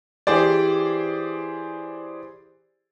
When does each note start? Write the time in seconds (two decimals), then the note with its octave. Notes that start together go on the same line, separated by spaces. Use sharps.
0.27 E3 G4 G#4 C5 D5